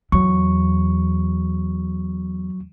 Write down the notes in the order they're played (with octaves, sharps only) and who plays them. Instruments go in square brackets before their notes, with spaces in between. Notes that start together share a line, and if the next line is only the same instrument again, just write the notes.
[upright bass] E2 [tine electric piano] F#3 C#6